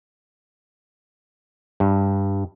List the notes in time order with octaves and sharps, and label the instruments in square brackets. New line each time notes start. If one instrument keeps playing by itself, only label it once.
[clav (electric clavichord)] G2